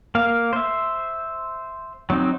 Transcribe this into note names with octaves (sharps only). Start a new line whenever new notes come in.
A#3 F5
C5 E5
F#3 C4 D#4